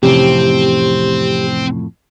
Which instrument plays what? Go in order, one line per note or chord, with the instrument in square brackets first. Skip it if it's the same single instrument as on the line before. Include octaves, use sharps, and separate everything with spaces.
[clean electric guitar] F2 A2 [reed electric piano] C3 E3 C#4 [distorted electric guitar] C4 [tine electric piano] G4